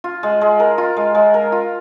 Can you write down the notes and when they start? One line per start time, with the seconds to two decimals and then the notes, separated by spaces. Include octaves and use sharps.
0.04 F4
0.23 G#3
0.41 G#3
0.60 A#4
0.78 F4
0.97 G#3
1.15 G#3
1.34 A#4
1.52 F4